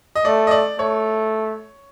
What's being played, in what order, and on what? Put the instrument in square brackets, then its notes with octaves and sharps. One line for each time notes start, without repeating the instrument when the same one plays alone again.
[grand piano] D#5
[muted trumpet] A3 [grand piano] D5
[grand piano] D#5
D5
[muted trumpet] A3 [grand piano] C#5